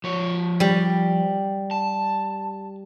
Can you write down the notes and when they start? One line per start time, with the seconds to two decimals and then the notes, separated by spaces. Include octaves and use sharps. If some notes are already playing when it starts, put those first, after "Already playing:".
0.04 F3 C#5
0.60 G3
1.71 A5